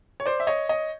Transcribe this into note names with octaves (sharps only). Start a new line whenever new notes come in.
C#5
C5 D5
E5
C#5 D#5
C#5 D#5